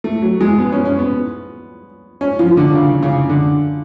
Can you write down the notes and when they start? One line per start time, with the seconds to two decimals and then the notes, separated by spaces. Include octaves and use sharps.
0.04 A3
0.22 F#3
0.41 G#3
0.58 B3
0.72 C#4
0.85 C#4
0.99 B3
2.21 C#4
2.39 F3
2.57 D3
2.75 C#3
3.03 C#3
3.29 D3